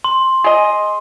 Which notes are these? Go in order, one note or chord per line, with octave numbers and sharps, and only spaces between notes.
C6
G#4 D#5